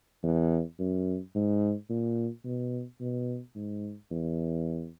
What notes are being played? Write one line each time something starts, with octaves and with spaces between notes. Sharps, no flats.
E2
F#2
G#2
A#2
B2
B2
G#2
E2